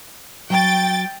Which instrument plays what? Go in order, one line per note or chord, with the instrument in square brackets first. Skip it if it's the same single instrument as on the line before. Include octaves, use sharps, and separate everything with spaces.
[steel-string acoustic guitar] F#3 [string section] G5 A6